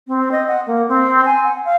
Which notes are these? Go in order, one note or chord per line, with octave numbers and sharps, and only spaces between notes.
C4
D#5
F#5
A#3
C4
G#5
F#5
F5